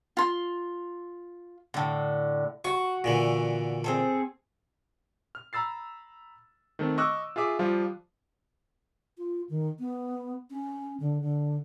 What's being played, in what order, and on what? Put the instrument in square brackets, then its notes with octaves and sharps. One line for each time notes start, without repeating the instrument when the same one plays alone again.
[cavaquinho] F4 C6
[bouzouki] A2 D3
[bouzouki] F#4 [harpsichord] C#6
[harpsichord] A#2 D3 E3
[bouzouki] C4 G#4 A4
[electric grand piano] F6
A#5 B5 E6 A6 C7
D#3 A3 C4
D#5 C#6 D6 E6 F#6
F4 G#4 E5 D6 D#6
F3 G3 F4
[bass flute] F4
D#3
B3
C#4
D3
D3